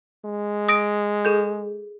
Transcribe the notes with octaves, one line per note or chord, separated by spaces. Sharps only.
G#3
D#6 A#6 D7
G#4 A4 G6